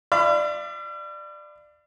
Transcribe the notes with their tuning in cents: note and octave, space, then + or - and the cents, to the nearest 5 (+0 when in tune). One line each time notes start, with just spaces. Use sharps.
D5 +20 F5 -45 B5 +25